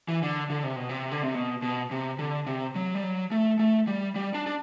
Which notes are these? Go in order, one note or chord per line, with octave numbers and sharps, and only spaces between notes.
E3
D3
D3
C3
B2
C3
D3
C3
B2
B2
C3
D3
C3
F#3
G3
F#3
A3
A3
G3
G3
D4
D4